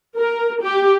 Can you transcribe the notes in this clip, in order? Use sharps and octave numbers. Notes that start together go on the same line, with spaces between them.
A#4
G4